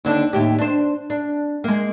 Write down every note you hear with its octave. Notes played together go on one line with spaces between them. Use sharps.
D#2 D3 D4
D#2 A2 G4
D4 C5
D4
G#3 A#3